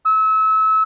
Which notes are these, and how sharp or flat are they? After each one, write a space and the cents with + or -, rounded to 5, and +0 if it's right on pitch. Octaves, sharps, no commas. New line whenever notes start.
E6 -30